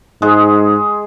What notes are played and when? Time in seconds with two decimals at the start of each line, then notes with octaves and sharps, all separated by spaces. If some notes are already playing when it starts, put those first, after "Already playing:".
0.22 G#2 G#3 G#4